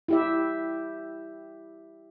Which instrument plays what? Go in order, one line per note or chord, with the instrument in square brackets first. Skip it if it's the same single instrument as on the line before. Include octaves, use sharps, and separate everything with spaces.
[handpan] E4 G4 E5